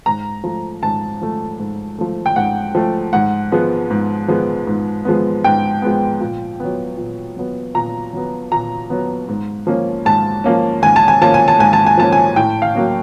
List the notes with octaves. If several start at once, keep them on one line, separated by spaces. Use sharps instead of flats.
G#2 A#5
F3 A3
G#2 A5
F3 A3
G#2
F3 A3
G5
G#2 F#5
F3 A3
G#2 F#5
F3 G#3 B3
G#2
F3 G#3 B3
G#2
F3 G#3 B3
G#2 G5
F3 G#3 B3
A#2
F#3 B3
A#2
F#3 B3
A#2 A#5
F#3 B3
A#2 A#5
F#3 B3
G#2
F3 A#3 C#4
G#2 A5
F3 A#3 C#4
G#2 G#5
A5
G#5
F3 A#3 C#4 A5
G#5
A5
G#2 G#5
A5
G#5
F3 A#3 C#4 A5
G#5
A2 G5
F5
F#3 A#3 C#4